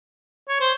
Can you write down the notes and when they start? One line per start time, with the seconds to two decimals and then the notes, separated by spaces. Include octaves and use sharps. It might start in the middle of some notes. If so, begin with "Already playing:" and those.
0.49 C#5
0.60 C5